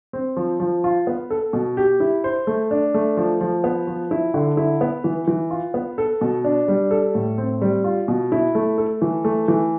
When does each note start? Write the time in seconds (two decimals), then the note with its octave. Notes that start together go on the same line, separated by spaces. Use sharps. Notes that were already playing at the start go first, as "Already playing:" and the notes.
0.13 C4
0.37 F3
0.60 F3
0.84 F4
1.07 B3
1.30 A4
1.53 B2
1.77 G4
2.00 E4
2.24 C5
2.47 A3
2.71 D4
2.94 A3
3.17 F3
3.41 F3
3.64 B3
3.87 F3
4.11 E4
4.34 D3
4.57 E4
4.81 B3
5.04 E3
5.27 E3
5.51 F4
5.74 B3
5.98 A4
6.21 B2
6.44 D4
6.68 G3
6.91 A4
7.15 A2
7.38 C4
7.62 G3
7.84 F4
8.08 B2
8.32 E4
8.55 A3
8.78 A4
9.02 E3
9.25 A3
9.48 E3